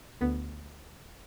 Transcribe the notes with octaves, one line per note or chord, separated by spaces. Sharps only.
D2 B3